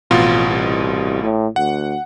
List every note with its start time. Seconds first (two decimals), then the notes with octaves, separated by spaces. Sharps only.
0.11 A1 F2 B2 F4
0.48 C2
1.23 A2
1.56 D2 F#5